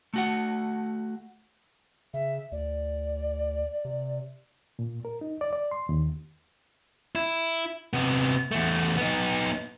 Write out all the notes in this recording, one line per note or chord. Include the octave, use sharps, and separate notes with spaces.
A3 F#4 F#5
C#3 E5
D2 D5
C3
A#2
A#4
D#4
D5
D5
C6
D#2
E4
C3 B3
E2 A3
B3 D#4